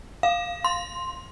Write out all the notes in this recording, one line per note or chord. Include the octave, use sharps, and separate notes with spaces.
F5
C6